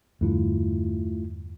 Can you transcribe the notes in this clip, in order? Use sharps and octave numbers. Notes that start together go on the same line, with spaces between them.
E2 G2 D3 A3 E4 F4